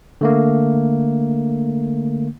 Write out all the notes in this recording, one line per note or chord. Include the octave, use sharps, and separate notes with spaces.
D3 A3 A#3